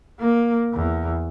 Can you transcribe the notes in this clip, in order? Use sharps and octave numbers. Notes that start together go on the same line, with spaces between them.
A#3
E2